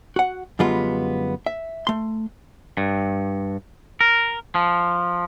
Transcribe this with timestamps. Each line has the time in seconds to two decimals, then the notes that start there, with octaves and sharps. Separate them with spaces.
0.16 F#4 F#5
0.59 F#2 D3 G3 G#3 B3 F4
1.46 E5
1.87 A3 C6
2.77 G2
4.01 A#4
4.55 F3